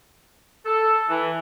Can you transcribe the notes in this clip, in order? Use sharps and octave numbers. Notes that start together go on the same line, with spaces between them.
A4
E3